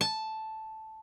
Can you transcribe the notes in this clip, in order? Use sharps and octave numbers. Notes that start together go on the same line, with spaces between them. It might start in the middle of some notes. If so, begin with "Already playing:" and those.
A5